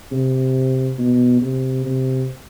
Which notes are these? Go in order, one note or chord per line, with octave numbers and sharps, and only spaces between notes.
C3
B2
C3
C3